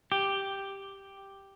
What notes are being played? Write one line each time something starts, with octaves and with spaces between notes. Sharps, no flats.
G4